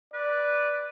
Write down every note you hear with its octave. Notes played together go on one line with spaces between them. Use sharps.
B4 D5